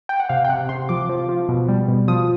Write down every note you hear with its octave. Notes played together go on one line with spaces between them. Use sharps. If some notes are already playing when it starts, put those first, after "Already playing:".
G5
F#5
C3 F5
G5
C3 F#5
C3 C6
F3 D6
F3
F3
B2
G3
B2
F3 D#6